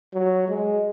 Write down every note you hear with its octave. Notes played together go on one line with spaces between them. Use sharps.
F#3
G#3